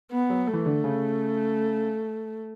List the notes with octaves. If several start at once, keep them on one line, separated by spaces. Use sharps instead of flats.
B3
F#3
A3
E3
D3
C#3